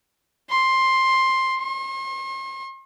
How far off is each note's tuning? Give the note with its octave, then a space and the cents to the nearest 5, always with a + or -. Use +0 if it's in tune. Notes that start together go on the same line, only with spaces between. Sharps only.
C6 +10
C6 +45